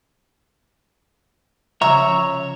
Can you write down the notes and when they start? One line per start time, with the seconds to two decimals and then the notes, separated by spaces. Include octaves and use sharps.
1.81 C#3 F3 C#5 E5 A#5